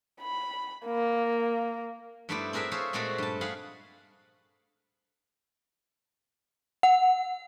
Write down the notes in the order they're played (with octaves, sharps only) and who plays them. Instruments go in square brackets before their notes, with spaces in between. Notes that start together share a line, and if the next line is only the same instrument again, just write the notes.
[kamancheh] B5
A#3
[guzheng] G2 A3 B3 E4 C5 D5
C4 G#4 A#4 B4 E5
G#4 A4 C5 C#5 E5 F5
A#2 G#3 A3 C4 F#4 A4
G2 A5
G#4 B4 F5 F#5
[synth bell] F#5